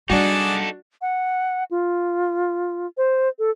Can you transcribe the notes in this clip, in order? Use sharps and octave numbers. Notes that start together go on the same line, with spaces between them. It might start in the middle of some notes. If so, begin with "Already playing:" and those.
G3 D4 D#4 F#4 G#4 A4 D5
F#5
F4
C5
A4